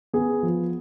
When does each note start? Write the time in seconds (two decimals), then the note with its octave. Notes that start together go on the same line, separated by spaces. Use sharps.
0.13 B3 G#4
0.43 F3